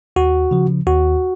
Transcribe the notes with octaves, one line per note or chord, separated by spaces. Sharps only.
D#2 F#4
C#3 F3
D#2 F#4